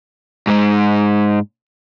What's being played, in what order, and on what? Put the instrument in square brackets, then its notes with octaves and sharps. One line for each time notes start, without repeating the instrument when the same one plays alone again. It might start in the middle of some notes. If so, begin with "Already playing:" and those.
[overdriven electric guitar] G#2 G#3